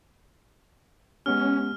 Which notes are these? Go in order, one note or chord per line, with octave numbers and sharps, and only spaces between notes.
G#3 B3 C#4 G4 F6